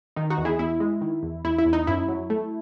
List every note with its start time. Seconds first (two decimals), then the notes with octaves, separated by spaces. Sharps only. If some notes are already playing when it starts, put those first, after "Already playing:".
0.16 D#3 D#4
0.30 D#4 F#4
0.38 E2
0.45 E4 G#4
0.59 E2 E4
0.80 G#3
1.01 D#3
1.23 E2
1.45 E2 E4
1.58 E4
1.66 E2
1.73 D#4
1.87 F#2 E4
2.08 F#3
2.30 A3